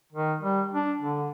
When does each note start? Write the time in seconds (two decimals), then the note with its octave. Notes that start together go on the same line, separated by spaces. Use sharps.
0.12 D#3
0.41 G3
0.73 D4
1.01 D3